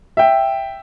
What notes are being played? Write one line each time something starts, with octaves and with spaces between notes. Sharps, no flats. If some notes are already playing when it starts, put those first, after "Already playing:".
E5 G5